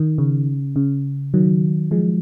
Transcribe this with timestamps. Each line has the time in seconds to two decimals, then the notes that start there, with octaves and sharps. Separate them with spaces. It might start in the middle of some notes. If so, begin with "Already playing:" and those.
Already playing: D#3
0.18 C#3
0.76 C#3
1.34 D#3 F#3
1.91 F3 G#3